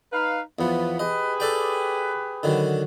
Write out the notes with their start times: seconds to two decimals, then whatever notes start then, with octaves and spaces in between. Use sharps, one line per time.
0.12 D#4 B4 F5
0.59 E2 F3 B3
0.99 G4 G#4 B4 D#5
1.40 A4 D5 G5
2.43 D3 D#3 F#3